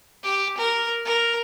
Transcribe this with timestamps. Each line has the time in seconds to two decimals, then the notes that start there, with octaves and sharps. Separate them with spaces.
0.23 G4
0.57 A#4
1.05 A#4